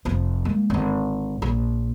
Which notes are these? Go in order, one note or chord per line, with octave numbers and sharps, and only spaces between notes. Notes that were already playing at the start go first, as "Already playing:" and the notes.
F1 F3
G#3 A#3
G#1 D3
A#1